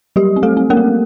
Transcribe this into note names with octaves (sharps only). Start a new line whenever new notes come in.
F#3 G3 G4
C4
A3 A4
C4
A#3 A#4
A3